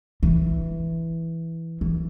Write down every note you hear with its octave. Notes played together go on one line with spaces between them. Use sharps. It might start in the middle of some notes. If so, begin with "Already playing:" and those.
E3
E3